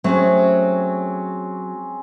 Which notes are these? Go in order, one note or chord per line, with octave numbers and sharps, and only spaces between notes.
F#3 A3 C4 C#4 G#4